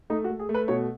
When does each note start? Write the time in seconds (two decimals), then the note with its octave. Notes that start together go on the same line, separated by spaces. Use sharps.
0.10 A3 D#4
0.24 F#4
0.30 A3
0.39 G#4
0.49 A3
0.54 B4
0.68 B2 C#5